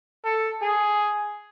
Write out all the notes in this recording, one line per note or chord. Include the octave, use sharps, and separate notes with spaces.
A4
G#4